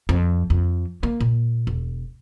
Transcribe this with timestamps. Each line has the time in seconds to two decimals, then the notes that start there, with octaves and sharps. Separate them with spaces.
0.09 F2
0.50 F2
1.03 A#3
1.21 A#2
1.67 E1